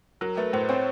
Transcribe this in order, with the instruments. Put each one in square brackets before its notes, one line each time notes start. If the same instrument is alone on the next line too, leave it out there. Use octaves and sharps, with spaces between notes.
[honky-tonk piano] F#3 [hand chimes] A#4
[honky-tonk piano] A3 [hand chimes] B4
[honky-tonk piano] A2 [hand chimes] C5
[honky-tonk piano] C4 [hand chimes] C#5